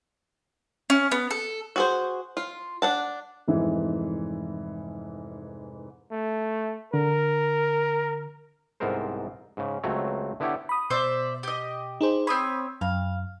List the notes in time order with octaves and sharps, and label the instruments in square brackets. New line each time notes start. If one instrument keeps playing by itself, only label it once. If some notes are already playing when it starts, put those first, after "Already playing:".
[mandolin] C#4
B3
A4
[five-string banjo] F#4 G#4 C5
F4
D4 F#5 A5
[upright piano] F1 G#2 E3 E5
[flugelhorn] A3
[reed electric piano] D3 [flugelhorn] A#4
[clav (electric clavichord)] C2 G#2 B3 A4 A#4 C5
G#2 C#3
C#2 F#3 A3 C4 C#5 A#5
D3 B3 E4 G4 A4 C#5
[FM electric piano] B5 D#6
[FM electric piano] B2 [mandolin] C5 D5 E5
[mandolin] G4 D#5
[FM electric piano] D#4 G#4 C5
[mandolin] C4 C#5 [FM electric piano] B5 D#6
[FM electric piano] F#2 [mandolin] F5